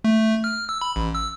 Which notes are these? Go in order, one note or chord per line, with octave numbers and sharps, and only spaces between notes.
A3
F6
E6
B5
A1
E6